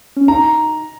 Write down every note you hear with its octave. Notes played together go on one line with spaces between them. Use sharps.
C#4
D#4 A#5